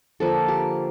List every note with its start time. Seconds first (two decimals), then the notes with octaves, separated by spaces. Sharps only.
0.20 D3 F3 A#3 A4
0.48 G4